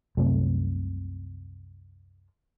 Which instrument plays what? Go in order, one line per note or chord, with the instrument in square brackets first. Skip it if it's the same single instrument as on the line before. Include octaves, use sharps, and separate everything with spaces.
[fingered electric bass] C2 F#2 C3 A3